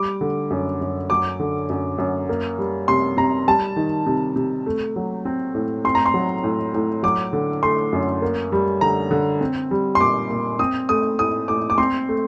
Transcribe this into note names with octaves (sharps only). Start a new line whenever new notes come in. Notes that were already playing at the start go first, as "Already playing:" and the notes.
Already playing: G3 D6
D3
F#2
F#2
F#3 D6
D3
F#2
F#2
A#3
G3
C3 C6
C3 A#5
G3 A5
D#3
C3
C3
A3
F#3
C4
A2
C4 C6
A#5
C6
F#3
A2
A2
F#3 D6
D3
A3 C6
F#2
A#3
G3
D3 A#5
D3
C4
G3
C6
A#2 D6
A#2
C4 D#6
A3 D#6
A2 D#6
A2 D6
D6
C4 C6
A3